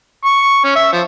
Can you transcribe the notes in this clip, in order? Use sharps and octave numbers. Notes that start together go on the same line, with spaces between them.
C#6
C#4
E5
F3